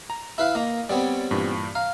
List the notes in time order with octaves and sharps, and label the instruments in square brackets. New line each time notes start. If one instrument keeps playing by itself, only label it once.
[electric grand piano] A#5
[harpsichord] E4 B4 F5
[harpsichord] A#3 [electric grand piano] D#5 F5 A#5
[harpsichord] G3 B3 C4 [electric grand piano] C#5 D5
[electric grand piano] G2 A#2 E3
[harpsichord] F5 [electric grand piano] A#5